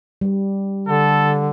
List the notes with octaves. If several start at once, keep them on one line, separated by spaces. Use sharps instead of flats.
G3
D3 A4